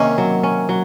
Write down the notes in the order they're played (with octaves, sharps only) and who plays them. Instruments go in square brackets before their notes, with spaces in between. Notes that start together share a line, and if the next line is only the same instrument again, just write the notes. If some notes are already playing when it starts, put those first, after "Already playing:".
Already playing: [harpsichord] C3 D#3 [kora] A#3 C#4
[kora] F#3
C#4
F#3